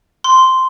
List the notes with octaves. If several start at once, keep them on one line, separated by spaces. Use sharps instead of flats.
C6